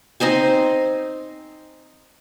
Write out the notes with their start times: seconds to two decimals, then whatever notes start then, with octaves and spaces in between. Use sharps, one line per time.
0.20 C4 D#4 C5 G#5